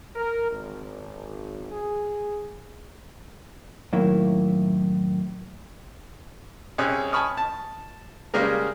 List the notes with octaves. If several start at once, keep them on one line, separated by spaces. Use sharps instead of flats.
A#4
G#1
G#4
F#2 A2 D#3 A#3 E4
C2 C#4 G#4 D#6 F#6
G#5 A5 B5 C#6 D#6 F6
A5
C#3 G3 G#3 A#3 G#4 A#4